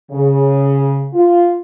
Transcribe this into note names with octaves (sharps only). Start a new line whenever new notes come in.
C#3
F4